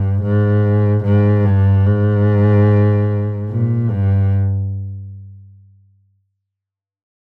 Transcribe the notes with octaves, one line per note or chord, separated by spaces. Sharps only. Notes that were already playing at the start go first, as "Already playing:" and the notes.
Already playing: G2
G#2
G#2
G2
G#2
A#2
G2